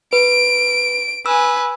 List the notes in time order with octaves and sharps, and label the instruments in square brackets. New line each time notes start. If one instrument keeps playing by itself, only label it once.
[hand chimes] B4 [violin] D7
[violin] B4 G#5 [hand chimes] E6